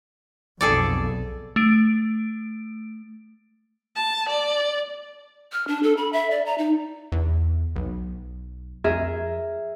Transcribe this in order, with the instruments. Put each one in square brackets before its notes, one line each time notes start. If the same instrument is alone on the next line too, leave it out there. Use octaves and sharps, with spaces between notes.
[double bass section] B1 F2 B2 [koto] G#4 A4 D5
[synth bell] A3 D7
[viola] A5
D5
[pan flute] F6
D4
A4
B5
E5
D5
A#5
D#4
[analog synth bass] E2
B1
[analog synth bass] F2 [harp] G#4 A#4 E5